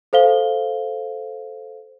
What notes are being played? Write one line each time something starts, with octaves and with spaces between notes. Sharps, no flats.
A4 C5 F5 G7